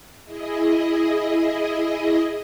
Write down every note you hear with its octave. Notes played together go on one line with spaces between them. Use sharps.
E4 G#4 D#5